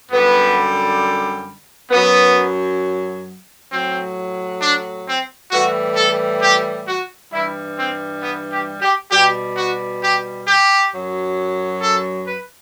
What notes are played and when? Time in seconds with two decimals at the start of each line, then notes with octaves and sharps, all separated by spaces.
0.11 F#2 D3 G3 B3
1.91 F#2 F#3 B3
3.71 A2 F#3 C4
4.62 D4
5.07 C4
5.51 A2 E3 G3 F#4
5.96 A4
6.41 G4
6.87 F#4
7.31 G2 E3 G3 E4
7.77 C4
8.22 B3
8.51 G4
8.81 G4
9.11 B2 G3 G4
9.57 F#4
10.02 G4
10.47 G4
10.92 F#2 F#3
11.82 A4
12.27 B4